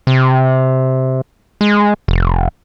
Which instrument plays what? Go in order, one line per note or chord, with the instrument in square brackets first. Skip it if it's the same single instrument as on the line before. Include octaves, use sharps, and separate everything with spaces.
[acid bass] C3
G#3
F1